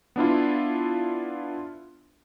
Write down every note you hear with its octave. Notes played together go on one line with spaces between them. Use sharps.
B3 D4 E4 F4